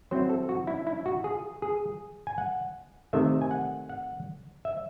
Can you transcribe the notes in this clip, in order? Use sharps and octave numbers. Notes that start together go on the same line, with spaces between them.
F#3 C4 E4 C5
A4
F#4
E4
E4
F#4
G#4
G#4
G#5
F#5
C3 D#3 A3 E5
G#5
F#5
F#5
E5